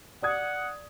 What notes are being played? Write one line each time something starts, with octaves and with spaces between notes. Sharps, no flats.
D5 F#5 D#6 G#6